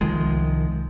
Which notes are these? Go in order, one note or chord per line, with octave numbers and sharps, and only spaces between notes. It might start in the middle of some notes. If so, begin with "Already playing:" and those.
C2 D#3 F3 G#3